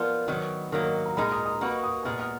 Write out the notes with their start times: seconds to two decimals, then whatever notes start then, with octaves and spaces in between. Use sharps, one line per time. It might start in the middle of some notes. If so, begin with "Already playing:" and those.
Already playing: F3 B3 F4 A#4 D5
0.28 D#3 F#3 B3
0.72 D#3 F#3 A#3 A#4
0.83 A#4
0.95 F#5
1.06 A#5
1.17 A#2 G#3 D#4 A#4 B5
1.32 D#6
1.46 D#6
1.61 A#3 D#4 F#4 B4
1.83 D#6
2.05 A#2 G#3 B3 F6
2.20 F6